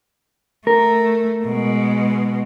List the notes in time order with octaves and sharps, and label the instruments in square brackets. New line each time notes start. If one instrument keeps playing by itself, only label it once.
[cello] A3 [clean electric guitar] A#4
[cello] B2 G#3